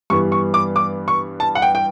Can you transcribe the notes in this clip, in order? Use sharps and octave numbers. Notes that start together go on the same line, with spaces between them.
G2 E3 G3 B3 C#6
C#6
D6
D6
C#6
A5
F#5
G5
G5